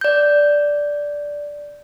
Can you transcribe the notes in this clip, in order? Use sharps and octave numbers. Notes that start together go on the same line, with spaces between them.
D5 G6